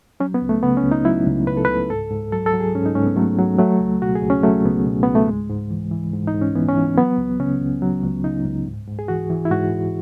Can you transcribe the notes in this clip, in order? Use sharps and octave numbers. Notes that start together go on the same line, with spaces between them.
F#3 C#4
B3
C#2
A3
C#3 B3
C#4
C#2
D#4
F#3 E4
C#2
C#3 B4
A4
B4
C#2
G#2 A4
G#2
F#3 A4
A4
F#3
G#4
G#2 C#4
D#4
G#2 C#4
B3
F#3 A3
F#3
F#3 A3
C#2
B2 F#4
G#4
C#2
C#4
F#3 A3
C#2 B3
B2
C#2 B3
A3
G#2 G#3
G#2
E3
E3
G#2
D#4
G#2
C#4
E3 B3
C#4
E3
F#3 B3
C#2
C#3 C#4
C#2
F#3
C#2
C#3 D#4
C#2
G#2
G#2
G#4
E3 F#4
E3
E4
G#2 F#4
G#2